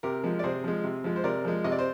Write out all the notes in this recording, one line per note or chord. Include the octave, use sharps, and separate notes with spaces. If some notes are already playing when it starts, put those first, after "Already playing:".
C3 G4 A#4
F3 G#3
D5
C3 G#4 C5
F3 G#3
C3
F3 G#3
C5
C3 A#4 D5
F3 G#3
C3 D#5
D5
C5